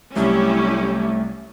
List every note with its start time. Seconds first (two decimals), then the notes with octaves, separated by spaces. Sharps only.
0.16 C2 F#3 A3 C#4 E4 G4